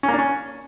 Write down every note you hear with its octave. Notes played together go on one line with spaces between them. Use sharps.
C#4
A#3
D4
C#4